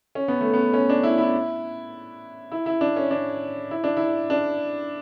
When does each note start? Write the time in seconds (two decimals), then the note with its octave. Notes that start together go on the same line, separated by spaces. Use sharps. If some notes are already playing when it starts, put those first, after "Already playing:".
0.15 C#4
0.28 B3
0.41 A3
0.53 B3
0.73 C#4
0.89 D4
1.03 E4
1.18 E4
2.52 E4
2.66 E4
2.81 D4
2.97 C#4
3.11 D4
3.71 E4
3.84 D4
3.97 E4
4.30 D4